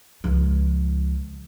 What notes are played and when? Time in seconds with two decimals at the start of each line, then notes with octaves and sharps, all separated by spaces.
0.24 C#2 F3